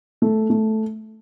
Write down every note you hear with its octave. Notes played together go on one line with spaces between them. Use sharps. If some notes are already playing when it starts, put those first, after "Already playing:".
A3
A3